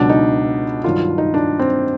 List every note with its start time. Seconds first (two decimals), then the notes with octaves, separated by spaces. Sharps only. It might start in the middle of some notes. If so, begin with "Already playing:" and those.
Already playing: C#2 B2 F#3 D4
0.09 D#4
0.84 G2 D#3 F#3 F4
1.18 D#4
1.34 D4
1.59 C4